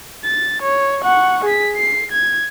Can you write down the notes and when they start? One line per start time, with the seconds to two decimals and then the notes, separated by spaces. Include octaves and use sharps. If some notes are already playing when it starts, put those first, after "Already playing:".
0.24 A6
0.62 C#5
1.01 F#5 C#6
1.44 G#4 B6
1.76 C7
2.11 G#6